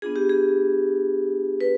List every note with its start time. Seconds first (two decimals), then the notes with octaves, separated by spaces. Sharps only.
0.02 B3 D4 F4 G#4
0.16 G4
0.29 G#4
1.61 B4